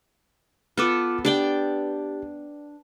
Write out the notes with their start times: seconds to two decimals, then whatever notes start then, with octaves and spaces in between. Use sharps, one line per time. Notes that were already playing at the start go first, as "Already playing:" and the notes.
0.77 B3 F4 A4 B4 D6 F6
1.25 D4 G4 D5 G5